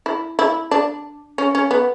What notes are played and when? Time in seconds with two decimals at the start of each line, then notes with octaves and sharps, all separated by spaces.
0.06 E4
0.39 E4
0.71 D4
1.38 C#4
1.55 C#4
1.71 B3